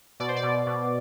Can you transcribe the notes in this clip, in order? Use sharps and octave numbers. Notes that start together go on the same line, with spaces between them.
B2 D5
C5
D5
B2
B2